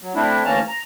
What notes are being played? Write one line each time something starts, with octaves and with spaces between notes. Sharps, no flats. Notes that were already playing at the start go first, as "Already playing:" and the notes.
F#3
A3 C4 D4 E4
D2 E3 A#3 C#4 A5 A#5
A#5